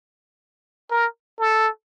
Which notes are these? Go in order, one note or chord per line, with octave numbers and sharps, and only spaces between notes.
A#4
A4